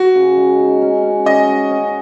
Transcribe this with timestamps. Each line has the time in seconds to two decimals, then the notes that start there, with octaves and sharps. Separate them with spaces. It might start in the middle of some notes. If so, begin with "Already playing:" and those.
Already playing: F#4
0.15 C#3
0.37 G#3
0.59 D#4
0.82 C#4
1.03 C#4
1.25 C#4 D#5
1.48 F#4
1.70 C#4